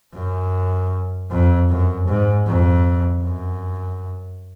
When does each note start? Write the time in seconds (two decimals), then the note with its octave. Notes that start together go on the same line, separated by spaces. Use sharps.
0.14 F#2
1.30 F2
1.69 F#2
2.07 G#2
2.47 F2
3.24 F#2